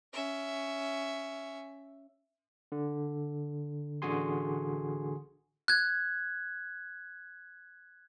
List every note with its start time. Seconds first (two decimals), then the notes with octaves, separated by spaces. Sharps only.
0.13 C#4 E5
2.72 D3
4.02 A1 D3 F#4 G#4 G#5 C6
5.68 F#6 G#6